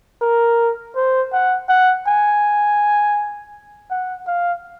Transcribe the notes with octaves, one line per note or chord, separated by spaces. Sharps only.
A#4
C5
F#5
F#5
G#5
F#5
F5